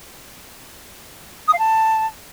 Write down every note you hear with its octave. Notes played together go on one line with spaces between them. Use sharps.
D#6
F5
A5